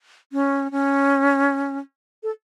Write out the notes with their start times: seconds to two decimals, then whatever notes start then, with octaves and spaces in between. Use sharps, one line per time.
0.32 C#4
0.71 C#4
2.23 A4